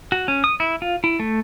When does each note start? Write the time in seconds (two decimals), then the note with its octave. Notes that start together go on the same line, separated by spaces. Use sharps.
0.12 F#4
0.28 C#4
0.44 D#6
0.60 E4
0.82 F4
1.04 E4
1.20 A3